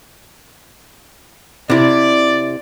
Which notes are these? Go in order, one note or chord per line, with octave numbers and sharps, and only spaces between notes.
C3 E4 D5